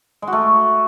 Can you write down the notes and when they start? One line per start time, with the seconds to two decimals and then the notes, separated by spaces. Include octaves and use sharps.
0.22 G#3
0.27 F#4
0.33 A3